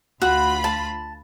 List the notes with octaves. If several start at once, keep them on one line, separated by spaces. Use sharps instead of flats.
D2 F4 F#4 B5
A5